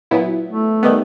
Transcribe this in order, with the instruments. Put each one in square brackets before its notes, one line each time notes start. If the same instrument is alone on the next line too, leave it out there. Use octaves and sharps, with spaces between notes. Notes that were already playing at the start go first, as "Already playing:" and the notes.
[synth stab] A#2 F#3 B3 E4
[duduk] A3
[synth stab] D#3 G3 B3